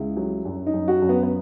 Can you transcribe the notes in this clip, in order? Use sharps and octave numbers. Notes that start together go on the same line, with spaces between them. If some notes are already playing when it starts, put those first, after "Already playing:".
Already playing: C#2 E4
F#3
F#2
D#4
F#2
F#4
F#2
B3
B3